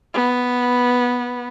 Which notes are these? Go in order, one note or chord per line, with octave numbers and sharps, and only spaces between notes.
B3